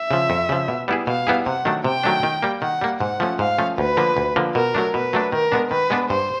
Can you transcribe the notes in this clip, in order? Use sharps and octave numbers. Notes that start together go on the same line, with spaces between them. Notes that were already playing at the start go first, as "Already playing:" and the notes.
Already playing: E5
C#3 F3
F2
C#3 F3
B2
G3 B3 E4 G#4
B2 F5
G3 B3 E4 G#4
C3 F#5
D#3 F#3 A3 D4
C3 G5
D#3 F#3 A3 D4
D#3
G3 A#3
D#3 F#5
G3 A#3
G#2 F#5
F3 A3 C#4
G#2 F5
F3 A3 C#4
D2 B4
D3 F3 A#3
D2
D3 F3 A#3
B2 A#4
F#3 A3 D4
B2 B4
F#3 A3 D4
D#3 A#4
G#3 B3 D4
D#3 B4
G#3 B3 D4
G2 C5